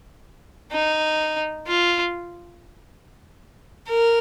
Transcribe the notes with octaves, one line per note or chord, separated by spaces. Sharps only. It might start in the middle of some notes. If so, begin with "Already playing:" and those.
D#4
F4
A#4